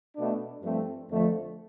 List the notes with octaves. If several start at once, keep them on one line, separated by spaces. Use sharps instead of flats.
B2 A3 D4
G2 F3 A3 C4
F2 D3 F3 A3